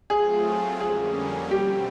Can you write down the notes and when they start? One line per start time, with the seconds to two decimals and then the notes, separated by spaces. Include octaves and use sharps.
0.10 F#3 A3 C4 F4 G#4
0.80 F2 D3 G3 A#3 C#4 G#4
1.51 B2 G3 C4 G4